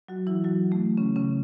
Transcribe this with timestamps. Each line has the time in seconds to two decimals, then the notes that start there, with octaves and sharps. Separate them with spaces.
0.08 F#3 F#4
0.27 E3 E4
0.44 F#3 F#4
0.72 A3
0.97 C#3 C#4
1.16 C#3 C#4